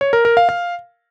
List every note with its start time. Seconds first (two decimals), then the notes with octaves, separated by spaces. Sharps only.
0.01 C#5
0.13 A#4
0.25 A#4
0.37 F5
0.49 F5